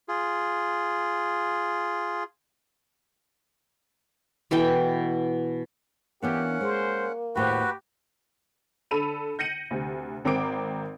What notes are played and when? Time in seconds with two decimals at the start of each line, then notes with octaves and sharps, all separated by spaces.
0.08 F4 G#4
4.51 B2 E3 A4 G5
6.22 E3 A#3 B3 C#4 D4 G4 F#5
6.61 G#3 C5
7.35 D#2 A2 F#4 G4 B4 C5
8.91 D3 A4 B5 D#7 F7
9.39 G6 A#6 C#7 D#7 F#7
9.71 D2 C3
10.25 G#1 C4 A#4 G5 D6 D7